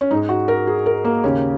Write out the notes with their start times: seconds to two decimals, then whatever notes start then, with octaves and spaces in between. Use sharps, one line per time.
0.01 C#4
0.11 G#2 G#3 D#4
0.29 F#4
0.48 A#4
0.67 G#4
0.86 A#4
1.04 A#3
1.24 D#2 C#3 A#3 C#4